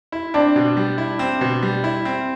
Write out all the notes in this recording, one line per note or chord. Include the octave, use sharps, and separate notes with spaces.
E4
C4 D4
B2
G3
E4
C4
B2
G3
E4
C4